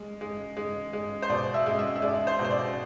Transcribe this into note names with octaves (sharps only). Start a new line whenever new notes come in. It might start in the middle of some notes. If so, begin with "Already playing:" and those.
Already playing: G#3
G#3
G#3
G#3
C5
B2 D5
E5
G#3
E5
E5
G#3 D5
C5
B2
C5
D5